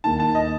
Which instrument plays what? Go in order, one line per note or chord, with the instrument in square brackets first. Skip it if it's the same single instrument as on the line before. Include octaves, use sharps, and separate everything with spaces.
[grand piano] D#2 D#3 A#3 D#4 [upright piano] A5
[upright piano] A5
D#5